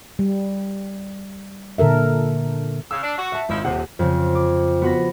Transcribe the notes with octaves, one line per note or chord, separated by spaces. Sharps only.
G3
A#2 D3 A4 A#4 E5
C#3 E6
D4
F#4
E5 A5
G#1 F3 D#4 E4
D#1 C3 F#5
F2 C#3
D6
B3 F#4 B5 A#6